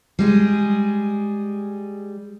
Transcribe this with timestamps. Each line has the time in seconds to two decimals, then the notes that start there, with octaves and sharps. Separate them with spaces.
0.19 G3 G#3 G#4